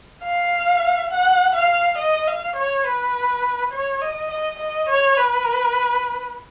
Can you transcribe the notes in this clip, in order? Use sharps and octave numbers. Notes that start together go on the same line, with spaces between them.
F5
F#5
F5
D#5
F5
C#5
B4
C#5
D#5
D#5
D#5
C#5
B4